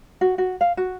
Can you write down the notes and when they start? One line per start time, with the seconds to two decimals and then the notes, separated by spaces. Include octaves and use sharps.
0.21 F#4
0.38 F#4
0.61 F5
0.77 F#4